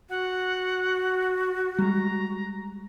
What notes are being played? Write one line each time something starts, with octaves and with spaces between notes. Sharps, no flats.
F#4 F#5
G3 G#3 A#5